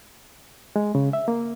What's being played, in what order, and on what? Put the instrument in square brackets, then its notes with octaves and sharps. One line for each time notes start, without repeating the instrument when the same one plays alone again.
[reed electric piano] G#3
C#3
E5
A#3